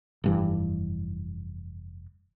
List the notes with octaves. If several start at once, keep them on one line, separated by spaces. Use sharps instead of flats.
F1 G2 E3